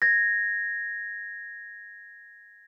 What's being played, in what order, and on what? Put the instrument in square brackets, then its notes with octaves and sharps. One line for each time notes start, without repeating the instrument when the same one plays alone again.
[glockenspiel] G#6 A#6